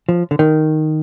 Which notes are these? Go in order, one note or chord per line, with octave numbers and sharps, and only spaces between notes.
F3
D3
D#3